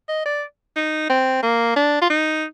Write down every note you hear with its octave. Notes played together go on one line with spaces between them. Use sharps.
D#5
D5
D#4
C4
A#3
D4
F4
D#4